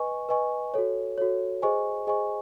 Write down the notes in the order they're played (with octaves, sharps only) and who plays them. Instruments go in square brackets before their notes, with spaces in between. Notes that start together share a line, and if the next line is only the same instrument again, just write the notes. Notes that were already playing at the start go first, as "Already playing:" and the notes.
Already playing: [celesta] B4 D#5 G#5 C#6
B4 D#5 G#5 C#6
F#4 A4 C#5
F#4 A4 C#5
G#4 C5 D#5 G#5 C#6
G#4 C5 D#5 G#5 C#6